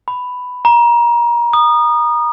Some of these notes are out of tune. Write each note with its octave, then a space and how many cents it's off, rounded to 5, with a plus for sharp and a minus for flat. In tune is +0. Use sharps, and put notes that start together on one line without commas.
B5 +10
A#5 +25
D#6 -25